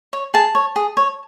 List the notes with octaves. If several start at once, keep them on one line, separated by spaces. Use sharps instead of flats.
C#5
G#4 A5
C#5
G#4
C#5